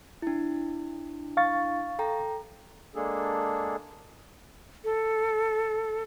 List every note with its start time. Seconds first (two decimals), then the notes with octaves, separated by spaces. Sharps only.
0.22 D4 E4
1.37 F5 C#6 A6
1.99 A4 G5 A#5
2.95 G#3 A#3 D4 G#4 A4
4.84 A4